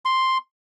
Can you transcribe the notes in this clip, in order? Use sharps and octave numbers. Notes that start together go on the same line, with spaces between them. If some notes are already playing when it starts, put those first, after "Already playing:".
C6